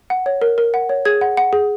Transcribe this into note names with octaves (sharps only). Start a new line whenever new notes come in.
F#5
C#5
A#4
A#4
F#5
C#5
G#4 G#6
F#5
F#5
G#4